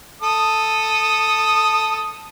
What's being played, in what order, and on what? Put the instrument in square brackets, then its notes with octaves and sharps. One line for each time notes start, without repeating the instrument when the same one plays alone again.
[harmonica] A4 D#6